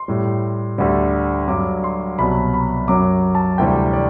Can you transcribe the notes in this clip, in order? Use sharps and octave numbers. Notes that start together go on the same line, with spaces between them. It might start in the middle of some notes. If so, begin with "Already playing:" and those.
Already playing: C6
A2 G3
D2 D3 G3
G2 F#3 D6
C6
C2 B2 F#3 B5
B5
F#2 F#3 D6
A5
D2 C3 E3 G3 G5
D5